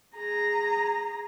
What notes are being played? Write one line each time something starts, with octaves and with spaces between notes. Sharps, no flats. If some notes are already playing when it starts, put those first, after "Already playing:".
G#4 A#5